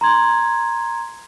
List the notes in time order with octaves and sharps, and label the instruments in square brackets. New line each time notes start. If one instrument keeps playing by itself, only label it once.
[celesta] A#5 C6 G#6